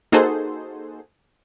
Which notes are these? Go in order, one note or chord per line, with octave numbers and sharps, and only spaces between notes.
A#3 D#4 F#4 G#4 A4 C5